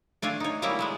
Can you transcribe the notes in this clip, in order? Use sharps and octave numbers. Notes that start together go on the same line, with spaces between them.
A3 D4 F4 G#5
D#4 C#5
F#3 G3 A#3 C#4 E4 A#5
F#3 G#3 B3